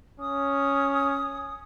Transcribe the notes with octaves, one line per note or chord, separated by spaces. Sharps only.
C#4 D#6